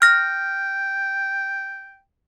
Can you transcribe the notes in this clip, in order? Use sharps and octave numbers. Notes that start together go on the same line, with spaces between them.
G5 F6 A#6